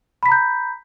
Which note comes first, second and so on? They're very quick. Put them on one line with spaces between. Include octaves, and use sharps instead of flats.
B5 B6 A#5 G6